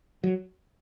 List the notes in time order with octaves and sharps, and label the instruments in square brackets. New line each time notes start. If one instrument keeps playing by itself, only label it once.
[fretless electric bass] F#3